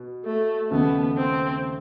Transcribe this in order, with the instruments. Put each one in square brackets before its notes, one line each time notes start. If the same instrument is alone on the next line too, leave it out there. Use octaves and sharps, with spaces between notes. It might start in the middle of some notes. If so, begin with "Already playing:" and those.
Already playing: [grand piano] B2
[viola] A3
[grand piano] D#2 C#3 F3 A3 [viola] B3
[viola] C4